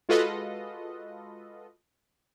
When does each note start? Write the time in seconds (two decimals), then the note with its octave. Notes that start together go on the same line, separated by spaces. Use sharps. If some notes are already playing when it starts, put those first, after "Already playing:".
0.09 G#3 F4 F#4 A4 B4 D#5